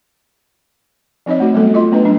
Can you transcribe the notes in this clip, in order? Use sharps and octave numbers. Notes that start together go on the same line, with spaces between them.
F3 C4 D#4 C#5 D#5
A3 D#4 F#4
F#3 G3 A3 B3 A4
F4 D#5 C6
A3 B3 C#4 D4 B4 D#5
F#3 G3 D4